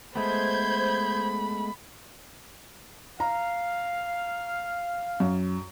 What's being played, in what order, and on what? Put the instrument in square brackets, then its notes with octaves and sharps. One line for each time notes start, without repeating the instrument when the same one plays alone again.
[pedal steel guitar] G#3 A3 B3 [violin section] C5 G6 G#6 [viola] B5
[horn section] F5 [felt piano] A#5
[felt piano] F#2